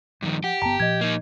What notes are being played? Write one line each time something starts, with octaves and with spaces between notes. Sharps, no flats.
G2 D#3 F3
G4 F#5
G1 B3 G5 A5 A#5
A#2 F3 D#5 G#6
A#3 D#4